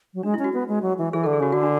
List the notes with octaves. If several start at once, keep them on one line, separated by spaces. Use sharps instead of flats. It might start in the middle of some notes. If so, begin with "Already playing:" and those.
F#3
G#3 D4
E4
C#4
F#4
B3
G#3
F#3
E3
E3 G#4
D3 A4
G#4
C#3 F#4
D3 F#4
D4